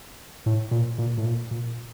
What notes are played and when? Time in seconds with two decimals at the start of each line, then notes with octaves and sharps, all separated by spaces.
0.46 A2
0.71 A#2
0.98 A#2
1.18 A2
1.25 A#2
1.51 A#2